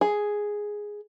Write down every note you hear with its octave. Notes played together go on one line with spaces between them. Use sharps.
G#4